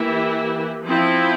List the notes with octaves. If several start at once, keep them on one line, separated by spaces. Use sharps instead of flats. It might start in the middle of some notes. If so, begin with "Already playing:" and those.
Already playing: E3 A#3 E4 G4
F3 C4 E4